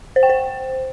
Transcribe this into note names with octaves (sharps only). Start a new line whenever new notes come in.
C5
G5
C5